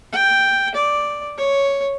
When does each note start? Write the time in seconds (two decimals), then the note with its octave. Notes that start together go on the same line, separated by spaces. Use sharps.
0.13 G5
0.75 D5
1.38 C#5